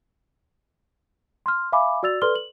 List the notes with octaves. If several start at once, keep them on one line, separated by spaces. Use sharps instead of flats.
C6 F6
E5 F5 G#5 B5 D6
F#4 D5 E6 A6 F7
A4 B4 D5 C6 F6 G7
F#7